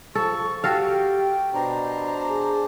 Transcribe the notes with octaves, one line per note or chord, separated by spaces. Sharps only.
F3 A4 C#6
F#4 G4 A4 F5 G5
B2 D4 C5 A#5
G#4